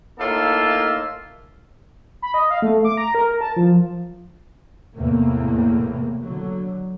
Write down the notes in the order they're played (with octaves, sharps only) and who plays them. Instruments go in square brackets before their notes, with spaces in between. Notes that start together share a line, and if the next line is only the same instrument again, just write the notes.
[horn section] A2 A#3 D#4 F4 A4 E5
[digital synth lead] B5
D#5
F5
A3
D6
A#5
A#4
A5
F3
[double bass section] E2 A2 C3 A#3
D3 F#3